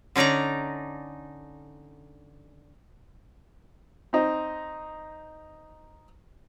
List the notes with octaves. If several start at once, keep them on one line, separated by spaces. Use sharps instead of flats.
D3 C#4 D#4 D5 A#5
C4 D#4